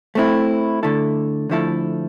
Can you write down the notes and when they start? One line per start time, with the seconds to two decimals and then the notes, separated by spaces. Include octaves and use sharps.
0.15 A3 C4 E4
0.83 D3 A3 E4 A4
1.50 D3 F3 A3 E4 A4